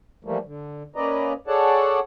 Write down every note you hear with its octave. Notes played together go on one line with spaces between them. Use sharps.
E3 F3 G3 A3 A#3
D3
A#3 C#4 B4 D5 D#5 A#5
G#4 A4 C#5 D5 F#5 A5